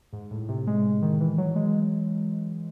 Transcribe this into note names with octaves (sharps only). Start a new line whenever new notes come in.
G#2
A2
C3
G#3
D#3
E3
F#3
G#3